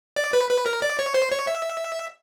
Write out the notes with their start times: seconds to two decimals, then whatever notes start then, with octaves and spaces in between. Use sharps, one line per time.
0.16 D5
0.33 B4
0.50 B4
0.66 A#4
0.82 D5
0.99 C#5
1.14 C5
1.31 C#5
1.47 E5